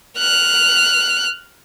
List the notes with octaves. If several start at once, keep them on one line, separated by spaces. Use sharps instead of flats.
F6 F#6